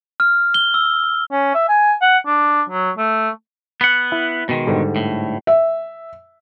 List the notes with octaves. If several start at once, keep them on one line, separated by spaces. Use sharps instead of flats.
F6
G7
E6
C#4
E5
G#5
F#5
D4
F#3
A3
B3 F#5
E4
B2 D#3 G#3
G#2 D3 G3
A2
E5